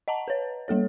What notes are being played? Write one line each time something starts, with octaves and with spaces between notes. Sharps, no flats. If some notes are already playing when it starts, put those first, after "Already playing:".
D#5 F#5 A5 A#5
B4 C#5
G3 A#3 A4 C#5